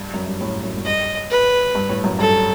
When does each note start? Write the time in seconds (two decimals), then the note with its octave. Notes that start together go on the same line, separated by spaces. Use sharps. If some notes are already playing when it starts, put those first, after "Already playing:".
Already playing: G2
0.14 F#2
0.27 G2
0.41 A2
0.64 F#2
0.78 F#2
0.85 G2 D#5
1.30 B4
1.75 G2
1.89 A2
2.04 F#2
2.19 G2 A4